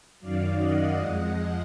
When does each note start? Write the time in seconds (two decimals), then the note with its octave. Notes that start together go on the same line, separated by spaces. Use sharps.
0.20 F#2 D#3 F#3 D5 F5
0.59 D#5 F#5
0.97 F2 F3 G#3 D#5 F#5